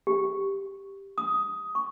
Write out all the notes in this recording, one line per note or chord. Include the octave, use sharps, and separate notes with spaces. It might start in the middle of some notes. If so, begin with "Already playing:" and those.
G4
D#6
C#6